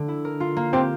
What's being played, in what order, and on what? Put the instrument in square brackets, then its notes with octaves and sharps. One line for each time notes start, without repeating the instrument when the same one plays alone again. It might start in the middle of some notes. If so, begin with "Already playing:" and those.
Already playing: [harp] D3 A3
E4
A#4
F4
A#3
[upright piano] C4 [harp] G4